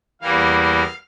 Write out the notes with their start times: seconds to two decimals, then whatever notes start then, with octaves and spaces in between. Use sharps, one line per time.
0.21 E2 E3 G3 A#3 F5
0.60 F5